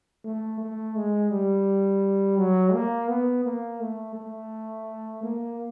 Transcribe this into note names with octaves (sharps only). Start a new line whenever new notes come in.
A3
A3
G#3
G3
F#3
A#3
B3
A#3
A3
A3
A#3